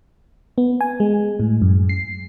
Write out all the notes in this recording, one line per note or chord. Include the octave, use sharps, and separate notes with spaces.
B3
G#5
G#3
A2
F#2
C7